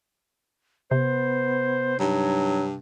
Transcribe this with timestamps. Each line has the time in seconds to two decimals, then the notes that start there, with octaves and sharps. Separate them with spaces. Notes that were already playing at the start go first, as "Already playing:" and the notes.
0.91 C3 B3 C5
2.00 G2 F#3 D#4